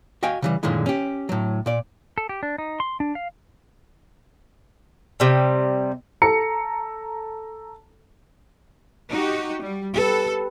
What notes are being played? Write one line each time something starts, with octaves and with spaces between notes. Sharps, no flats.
F#4 D#5 F5 G5 G#5
C#3 E3 G3
F#2 A#2 D3 D#3 G#3 E4
C#4 G4
A2 F#3
A#2 D5
A4
G4
D4
D#4
C6
D4
F5
C3 G3
A4 A#5 C#7
D#4 F#4 G4
G3
G4 A4 B4